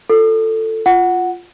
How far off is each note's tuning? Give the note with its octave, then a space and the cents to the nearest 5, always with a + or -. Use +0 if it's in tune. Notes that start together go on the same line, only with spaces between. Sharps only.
F4 +10 A4 +15
F4 +0 F#5 +0